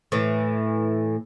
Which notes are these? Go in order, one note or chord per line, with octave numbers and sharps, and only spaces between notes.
A2 E3